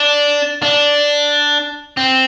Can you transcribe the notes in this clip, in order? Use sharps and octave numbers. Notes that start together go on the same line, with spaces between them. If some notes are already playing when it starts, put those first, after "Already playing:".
Already playing: D4
D4
C4